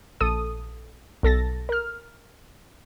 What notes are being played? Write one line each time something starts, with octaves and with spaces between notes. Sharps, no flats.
A#1 A4 D#6 D#7
B1 A4 A6 A#6
A#4 F6